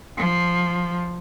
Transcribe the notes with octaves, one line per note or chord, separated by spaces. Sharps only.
F3